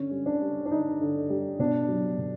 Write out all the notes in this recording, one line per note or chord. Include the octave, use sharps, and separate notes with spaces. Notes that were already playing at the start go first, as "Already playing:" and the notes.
Already playing: D3 C#4
G3
D4
G3
D4
D3 D#4
D3
G3
B2 D4
F#3
B2